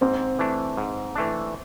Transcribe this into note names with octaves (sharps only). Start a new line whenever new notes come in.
G#2 C4
E3 A3 D4
G#2
E3 A3 D4